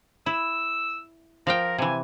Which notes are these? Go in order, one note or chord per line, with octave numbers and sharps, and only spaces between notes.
E4 E6
F3 A#4 F5 G5
C3 E3 G#5